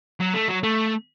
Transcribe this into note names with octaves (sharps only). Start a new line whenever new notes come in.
F#3
A3
F#3
A3